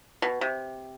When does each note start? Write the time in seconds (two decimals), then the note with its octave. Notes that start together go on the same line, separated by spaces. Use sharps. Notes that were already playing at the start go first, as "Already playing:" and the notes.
0.22 B2
0.41 C3